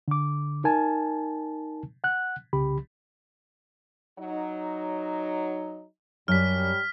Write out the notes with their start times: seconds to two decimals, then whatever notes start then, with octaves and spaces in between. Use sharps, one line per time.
0.08 D3 D6
0.64 D#4 A#4 G#5 A5
2.04 F#5 F#6
2.53 C2 C#3 G4 B5
4.19 F#3 D#4
6.28 F#2 G3 F6 B6